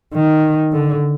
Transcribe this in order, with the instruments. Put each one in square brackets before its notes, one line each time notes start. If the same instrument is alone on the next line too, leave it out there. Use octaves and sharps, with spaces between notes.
[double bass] D#3
D3